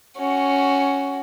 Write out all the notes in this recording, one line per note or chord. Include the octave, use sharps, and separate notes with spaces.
C#4 F#4